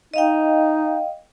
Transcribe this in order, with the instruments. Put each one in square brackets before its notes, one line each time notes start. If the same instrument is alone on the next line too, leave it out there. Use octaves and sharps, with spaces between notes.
[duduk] D#4 [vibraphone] D#5 F5 G5